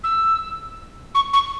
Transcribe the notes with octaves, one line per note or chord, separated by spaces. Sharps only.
E6
C#6
C#6